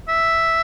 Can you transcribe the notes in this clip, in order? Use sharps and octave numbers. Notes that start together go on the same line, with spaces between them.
E5